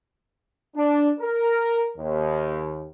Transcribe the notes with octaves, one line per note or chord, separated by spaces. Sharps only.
D4
A#4
D#2